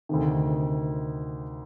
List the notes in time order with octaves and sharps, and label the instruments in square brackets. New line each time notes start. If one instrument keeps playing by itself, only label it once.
[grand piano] D2 C3 D#3